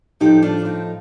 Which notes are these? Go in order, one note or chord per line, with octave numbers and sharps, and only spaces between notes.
A2 F3 A3 D#4 G4
D4 F4
C4 D#4